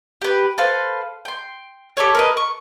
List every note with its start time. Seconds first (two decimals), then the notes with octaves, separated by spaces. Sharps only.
0.22 G4 B4
0.58 A4 B4 C5 F5
1.25 G5 C6
1.97 G4 A4 A#4 C#5
2.15 A#4 B4 D#5
2.37 C#6